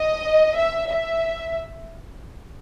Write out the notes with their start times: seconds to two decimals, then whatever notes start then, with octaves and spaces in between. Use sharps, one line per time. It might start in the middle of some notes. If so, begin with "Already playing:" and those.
Already playing: D#5
0.56 E5
0.88 E5